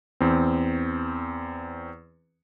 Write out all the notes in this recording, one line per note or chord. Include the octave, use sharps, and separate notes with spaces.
E2 C4